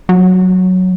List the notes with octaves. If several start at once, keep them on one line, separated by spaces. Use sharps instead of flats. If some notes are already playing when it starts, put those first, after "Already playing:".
F#3